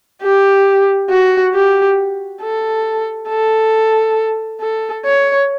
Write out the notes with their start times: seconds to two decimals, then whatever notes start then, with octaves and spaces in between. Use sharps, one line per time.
0.23 G4
1.10 F#4
1.54 G4
2.42 A4
3.29 A4
4.61 A4
5.05 C#5